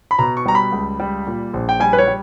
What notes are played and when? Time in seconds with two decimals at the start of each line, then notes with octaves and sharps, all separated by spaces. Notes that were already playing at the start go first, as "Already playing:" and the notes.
0.11 B5
0.19 B2 A#5
0.37 C#6
0.46 G3 A#5
0.55 B5
0.72 C#2
1.00 G3
1.27 A#2
1.53 A#1
1.69 G5
1.80 G3 G#5
1.93 B4
1.98 C#5
2.07 G3